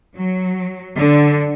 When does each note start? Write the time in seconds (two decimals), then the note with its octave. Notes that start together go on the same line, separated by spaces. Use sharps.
0.16 F#3
0.96 D3